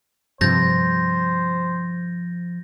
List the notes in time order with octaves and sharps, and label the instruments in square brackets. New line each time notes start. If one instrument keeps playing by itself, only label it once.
[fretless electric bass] G2 C3 [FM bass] F3 [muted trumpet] C5 [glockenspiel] G6 A6 A#6